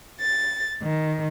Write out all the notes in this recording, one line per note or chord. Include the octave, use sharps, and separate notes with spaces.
A6
D#3